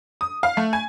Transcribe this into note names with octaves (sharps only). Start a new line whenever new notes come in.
D#6
F5
A3
G#5